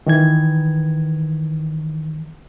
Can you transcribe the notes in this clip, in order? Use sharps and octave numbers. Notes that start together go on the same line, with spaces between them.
D#3 E3 G#6